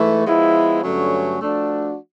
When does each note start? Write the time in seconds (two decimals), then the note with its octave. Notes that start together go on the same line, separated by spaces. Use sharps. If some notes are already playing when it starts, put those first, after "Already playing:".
Already playing: G#2 E3 A3
0.26 F3 G#3 B3 E4
0.83 G2 D3 F#3 A3 C#4
1.40 F3 A3 D4 F#4